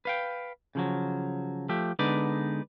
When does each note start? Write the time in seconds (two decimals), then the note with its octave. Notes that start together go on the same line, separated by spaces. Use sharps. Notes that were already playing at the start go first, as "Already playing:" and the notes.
0.05 B4 F5 G5
0.75 C#3 F3 F#3
1.69 F3 A3 G4
1.99 D3 G#3 B3 D#4 B4 D5